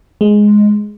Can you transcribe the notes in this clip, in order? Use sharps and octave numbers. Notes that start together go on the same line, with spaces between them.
G#3